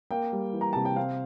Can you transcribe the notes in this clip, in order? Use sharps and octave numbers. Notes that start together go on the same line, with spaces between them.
A#3 G5
G3
E3
A#5
C3 A5
G5
C4 F5